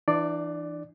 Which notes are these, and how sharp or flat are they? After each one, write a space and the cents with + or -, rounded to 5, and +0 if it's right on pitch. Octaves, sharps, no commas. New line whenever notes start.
E3 +15 D4 +35 D5 +0